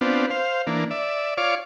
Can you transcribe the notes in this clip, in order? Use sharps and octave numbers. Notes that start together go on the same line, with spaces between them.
B3 C4 D4 F4
C5 F5
E3 A#3 D4
D5 E5
F4 C#5 D5 F5 D6